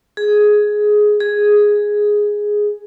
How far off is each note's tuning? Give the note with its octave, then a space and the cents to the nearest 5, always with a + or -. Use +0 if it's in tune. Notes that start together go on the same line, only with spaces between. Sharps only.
G#4 +10
G#4 +0